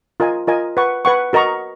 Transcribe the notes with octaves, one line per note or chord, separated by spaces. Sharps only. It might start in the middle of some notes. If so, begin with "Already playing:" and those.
F4 A#4 D#5 G#5
F4 A#4 D#5 G#5
B4 F#5 C#6
B4 F#5 C#6
F#4 A#4 D#5 A#5 C#6